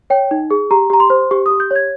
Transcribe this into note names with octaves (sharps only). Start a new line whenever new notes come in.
C#5 G5
D#4
G#4
G4 A#5
G4 A#5
C6
C5
G4 C#6
G4 D#6
G6
C#5 G#6